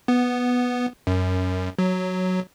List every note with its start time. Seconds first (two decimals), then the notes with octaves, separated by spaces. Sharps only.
0.08 B3
1.07 F#2
1.79 F#3